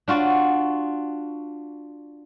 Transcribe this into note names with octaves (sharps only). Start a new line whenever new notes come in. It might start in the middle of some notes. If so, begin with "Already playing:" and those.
D4 F4 F#4 D5